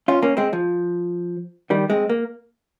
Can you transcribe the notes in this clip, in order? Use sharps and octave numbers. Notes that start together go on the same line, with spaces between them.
C#4 F4
A#3 C#4
G#3 C4
F3
D#3 G3
G#3 C4
A#3